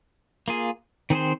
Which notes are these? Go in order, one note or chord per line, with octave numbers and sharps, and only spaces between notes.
A#3 F4 G#4
D#3 C4 G#4 C5